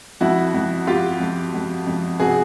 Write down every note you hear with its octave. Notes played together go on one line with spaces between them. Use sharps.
F2 E4 F#4
F2
F2 F4 G4
F2
F2
F2
C3 F#4 G#4